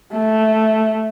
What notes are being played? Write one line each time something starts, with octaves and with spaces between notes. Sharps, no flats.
A3